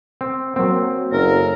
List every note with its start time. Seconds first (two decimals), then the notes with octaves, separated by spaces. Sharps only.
0.21 C4
0.56 F#3 A#3 C4
1.12 F#1 C#4 A4 A#4